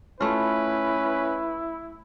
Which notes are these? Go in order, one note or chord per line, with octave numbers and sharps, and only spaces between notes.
A3 C#4 E4 F4 B4